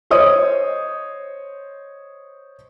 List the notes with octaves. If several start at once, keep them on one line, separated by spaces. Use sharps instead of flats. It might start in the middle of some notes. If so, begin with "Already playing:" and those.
C5 C#5 D#5 D#6